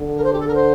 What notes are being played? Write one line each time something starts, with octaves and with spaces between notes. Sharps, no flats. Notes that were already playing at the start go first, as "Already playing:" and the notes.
Already playing: D3
A#4
C5
G4
A4
A#4
C5